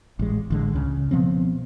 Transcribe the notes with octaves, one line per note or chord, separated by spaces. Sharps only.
A1 G#3
A1 D3 G#3
C#2 C#3
B2 F3 B3 C4